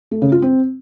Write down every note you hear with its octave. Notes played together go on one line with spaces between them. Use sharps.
A3
C#3
F4
C4